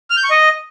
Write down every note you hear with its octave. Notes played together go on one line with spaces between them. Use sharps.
F6
G6
C#6
D#5